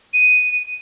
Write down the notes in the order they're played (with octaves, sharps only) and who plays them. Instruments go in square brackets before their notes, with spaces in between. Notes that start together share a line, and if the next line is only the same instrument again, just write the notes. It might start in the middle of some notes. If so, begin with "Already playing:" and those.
[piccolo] D#7